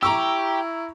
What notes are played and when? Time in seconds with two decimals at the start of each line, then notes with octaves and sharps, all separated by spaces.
0.03 E4 G4 A#5 C#6 E6